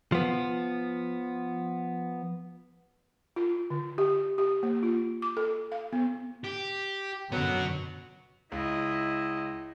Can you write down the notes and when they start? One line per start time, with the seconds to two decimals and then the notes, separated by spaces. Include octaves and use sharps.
0.12 F3 B3
3.36 F4
3.70 D3
3.98 G4
4.38 G4
4.63 A#3
4.83 F4
5.22 D6
5.37 A4
5.72 F5
5.93 B3
6.44 G4
7.32 F#2 D3 F#3 B3 F#4
8.52 C#2 E4 D#5